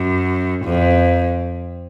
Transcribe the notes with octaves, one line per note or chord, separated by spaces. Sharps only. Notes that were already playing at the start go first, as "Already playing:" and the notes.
Already playing: F#2
F2